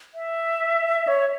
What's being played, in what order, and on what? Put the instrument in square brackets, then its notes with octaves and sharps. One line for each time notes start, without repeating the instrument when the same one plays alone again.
[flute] E5
C#5